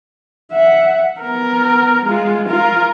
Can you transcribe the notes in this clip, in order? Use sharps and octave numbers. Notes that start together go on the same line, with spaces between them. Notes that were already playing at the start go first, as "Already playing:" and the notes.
E5 F#5
B3 A#4
G#3 F4
F4 A#4